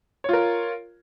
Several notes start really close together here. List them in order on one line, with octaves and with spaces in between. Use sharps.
C#5 F4 A#4